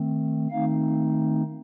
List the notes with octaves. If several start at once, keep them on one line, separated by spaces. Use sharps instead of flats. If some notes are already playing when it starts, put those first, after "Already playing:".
Already playing: D#3 A3 C4
D#3 A3 C4 D#4 F5